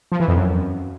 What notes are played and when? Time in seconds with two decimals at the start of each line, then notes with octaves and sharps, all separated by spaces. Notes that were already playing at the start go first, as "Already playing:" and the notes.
0.12 F3
0.20 E3
0.28 F2
0.36 F#2